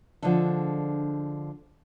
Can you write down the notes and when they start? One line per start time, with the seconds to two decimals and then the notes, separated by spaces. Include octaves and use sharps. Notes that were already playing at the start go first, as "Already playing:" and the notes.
0.22 D3 F3 G#3 D4 A4